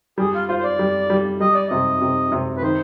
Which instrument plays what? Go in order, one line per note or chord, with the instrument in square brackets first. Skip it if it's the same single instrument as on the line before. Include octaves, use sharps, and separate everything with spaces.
[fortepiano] G3 [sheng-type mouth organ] G#4
[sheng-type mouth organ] F4
[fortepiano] F4 [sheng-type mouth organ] C5
[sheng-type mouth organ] C5
D5
[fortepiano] G3
G3
[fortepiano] G3 [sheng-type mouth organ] D#5
[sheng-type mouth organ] D5
[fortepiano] C3 [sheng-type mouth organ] D#5
[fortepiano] C3
C3
[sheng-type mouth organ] B4
[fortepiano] D#3 [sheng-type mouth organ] C5